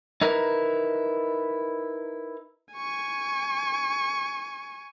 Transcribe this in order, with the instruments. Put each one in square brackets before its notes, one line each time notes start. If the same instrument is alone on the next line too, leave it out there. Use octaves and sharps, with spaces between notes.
[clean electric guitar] D#4 E4 A#4 B4
[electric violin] G#5 C#6